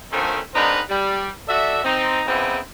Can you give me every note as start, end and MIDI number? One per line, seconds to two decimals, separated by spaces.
0.12 0.39 50
0.12 0.39 51
0.12 0.39 53
0.12 0.39 57
0.12 0.39 60
0.12 0.39 61
0.54 0.80 44
0.54 0.80 60
0.54 0.80 62
0.54 0.80 63
0.54 0.80 70
0.54 0.80 71
0.90 1.29 55
1.48 1.82 66
1.48 1.82 69
1.48 1.82 74
1.48 1.82 76
1.84 2.21 60
1.84 2.21 63
2.27 2.58 49
2.27 2.58 52
2.27 2.58 59
2.27 2.58 60
2.27 2.58 63
2.27 2.58 64